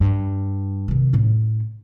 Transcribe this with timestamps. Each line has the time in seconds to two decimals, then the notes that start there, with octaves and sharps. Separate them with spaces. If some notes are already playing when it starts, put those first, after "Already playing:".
0.01 G2
0.88 C3 D#3
1.13 A2 C#4